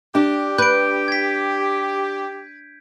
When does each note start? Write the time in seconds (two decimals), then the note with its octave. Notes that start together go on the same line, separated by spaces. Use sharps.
0.15 D4 G4
0.58 B4 G6 D7
1.08 G#6 B6